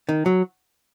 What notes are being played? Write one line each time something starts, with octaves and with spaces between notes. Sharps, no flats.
D#3
F#3